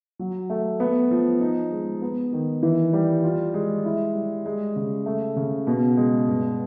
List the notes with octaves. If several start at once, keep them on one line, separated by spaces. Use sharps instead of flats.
F#3
A3
B3
F3
D#4
G#3
B3
D#3
E3
G3
F4
G#3
E4
G3
G#3
C#3
A3
C#3
B2
G#3
G2